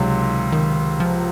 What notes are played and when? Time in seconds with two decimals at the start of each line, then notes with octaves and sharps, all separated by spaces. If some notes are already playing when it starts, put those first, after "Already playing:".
Already playing: C#2 C3 D#3 F#3
0.52 D#3
1.00 F3